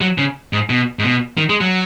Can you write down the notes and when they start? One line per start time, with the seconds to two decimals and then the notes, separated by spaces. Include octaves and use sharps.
0.01 F#3
0.18 C#3
0.53 G#2
0.70 B2
0.99 G#2
1.04 B2
1.37 D#3
1.49 G#3
1.61 F#3